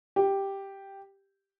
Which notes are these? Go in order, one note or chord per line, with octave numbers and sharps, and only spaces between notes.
G4